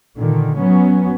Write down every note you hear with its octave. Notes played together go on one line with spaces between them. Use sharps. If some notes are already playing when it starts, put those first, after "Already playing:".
A#2 D3 D#3
F#3 B3 C#4